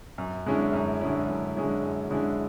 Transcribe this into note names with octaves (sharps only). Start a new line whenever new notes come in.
F#2
D3 G#3 C#4 E4
F#2
D3 G#3 C#4 E4
F#2
D3 G#3 C#4 E4
F#2
D3 G#3 C#4 E4